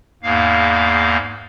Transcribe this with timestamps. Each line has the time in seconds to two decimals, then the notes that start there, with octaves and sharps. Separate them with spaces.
0.23 E2 G#2 A#3 F5